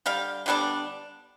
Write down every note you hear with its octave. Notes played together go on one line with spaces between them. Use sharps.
D3 G3 F5
D3 G3 B3 D4